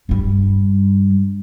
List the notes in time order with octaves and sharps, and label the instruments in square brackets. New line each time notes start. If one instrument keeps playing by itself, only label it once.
[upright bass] G2 G3